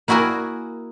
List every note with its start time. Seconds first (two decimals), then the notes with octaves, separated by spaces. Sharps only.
0.08 A#3 E4 F#4 G#4 A#4